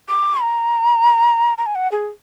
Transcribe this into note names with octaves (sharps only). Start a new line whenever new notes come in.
D6
A#5
A#5
G#5
F#5
G#4